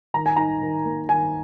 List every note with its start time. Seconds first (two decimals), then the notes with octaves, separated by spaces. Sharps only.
0.14 D#3 A#5
0.26 G#5
0.37 D#4 A#5
0.61 D#3
0.85 A#3
1.09 D#3 G#5